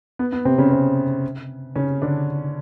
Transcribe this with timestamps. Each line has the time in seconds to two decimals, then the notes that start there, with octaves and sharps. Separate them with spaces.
0.19 B3
0.32 B3
0.45 C3 C4
0.58 C#3 C#4
0.71 C3 C4
1.76 C#3 C#4
2.02 D3 D4